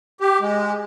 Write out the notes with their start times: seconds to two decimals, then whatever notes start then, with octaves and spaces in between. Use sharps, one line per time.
0.21 G4
0.41 G#3